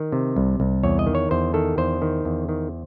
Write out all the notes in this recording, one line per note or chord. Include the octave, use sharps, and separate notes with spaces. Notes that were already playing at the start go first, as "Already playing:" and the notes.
Already playing: D#3
C3
C2
C2
E2 C#5
D#5
D#3
C#5
E2 C5
D#3 A4
E2 C5
D#3
E2
D#3